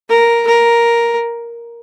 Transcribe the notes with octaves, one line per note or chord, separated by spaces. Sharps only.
A#4
A#4